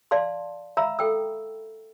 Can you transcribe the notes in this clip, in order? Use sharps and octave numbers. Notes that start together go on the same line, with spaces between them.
D5 F5 A5 C6
E5 F5 A#5 B5 E6
A4 G5 E6